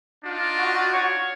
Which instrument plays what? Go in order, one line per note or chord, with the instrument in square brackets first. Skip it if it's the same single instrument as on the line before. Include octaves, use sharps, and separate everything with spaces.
[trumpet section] D4 D#4 F4
[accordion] F#4
[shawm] C#5